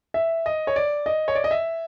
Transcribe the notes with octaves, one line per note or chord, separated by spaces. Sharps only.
E5
D#5
C#5
D5
D#5
C#5
D5
D#5
E5